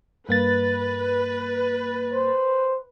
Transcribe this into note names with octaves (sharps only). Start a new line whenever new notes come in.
G2 A#3 B4 A6
C5